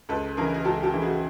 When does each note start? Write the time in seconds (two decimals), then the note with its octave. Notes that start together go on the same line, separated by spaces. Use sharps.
0.09 C#2 A4 B4
0.37 C#3 E3 G#4 A#4
0.54 G#4
0.65 C#2 G4 A4
0.83 G4 A4
0.93 C#3 E3
1.02 F#4 G#4